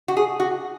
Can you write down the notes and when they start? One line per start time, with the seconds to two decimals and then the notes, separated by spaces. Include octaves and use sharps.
0.08 F#4
0.17 G#4
0.40 F#4